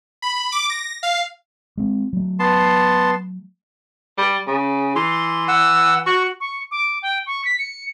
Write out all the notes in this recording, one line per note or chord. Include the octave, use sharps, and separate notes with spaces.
B5
D6
A#6
F5
G#3 C4
F#3 A3
B3 A5 C6
G3
C#3
E3 C6
F#5 E6
F#4 C#6
C#6
D6
G5
C#6
B6
C#7